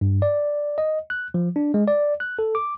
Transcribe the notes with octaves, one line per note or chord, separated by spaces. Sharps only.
G2
D5
D#5
F#6
F3
D4
G#3
D5
F#6
A4
D6